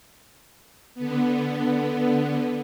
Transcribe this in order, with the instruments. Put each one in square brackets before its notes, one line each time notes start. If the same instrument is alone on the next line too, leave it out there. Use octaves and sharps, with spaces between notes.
[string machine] D3 B3